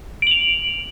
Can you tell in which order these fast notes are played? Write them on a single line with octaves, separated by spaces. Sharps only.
D7 F#7 F7